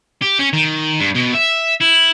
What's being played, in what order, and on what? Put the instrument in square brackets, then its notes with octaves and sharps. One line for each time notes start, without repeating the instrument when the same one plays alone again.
[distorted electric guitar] G4
C#4
D#3
G2
B2
E5
E4